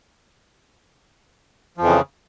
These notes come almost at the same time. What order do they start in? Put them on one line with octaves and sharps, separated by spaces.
F3 F2 E3 C#3